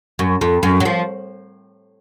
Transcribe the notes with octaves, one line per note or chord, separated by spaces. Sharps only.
F#2
F2
F#2
F#3
F3